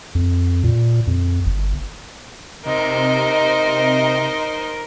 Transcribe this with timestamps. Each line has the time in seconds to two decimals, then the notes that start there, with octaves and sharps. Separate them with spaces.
0.15 F2
0.64 A#2
1.07 F2
1.46 G1
2.66 C3 D#4 A#4 C5 D#5